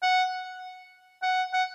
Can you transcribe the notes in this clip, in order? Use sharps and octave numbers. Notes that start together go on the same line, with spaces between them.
F#5
F#5
F#5